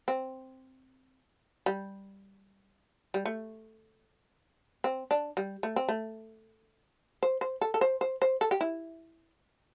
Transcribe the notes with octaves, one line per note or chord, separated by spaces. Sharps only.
C4
G3
G3
A3
C4
D4
G3
A3
C4
A3
C5
C5
A4
A4
C5
C5
C5
A4
G4
E4